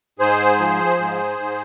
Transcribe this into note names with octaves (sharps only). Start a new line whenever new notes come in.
G#2 G#4 C5
F3
G#2
G#2